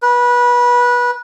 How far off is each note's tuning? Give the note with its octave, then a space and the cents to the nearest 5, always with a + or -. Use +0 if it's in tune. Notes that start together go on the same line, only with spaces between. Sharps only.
B4 -25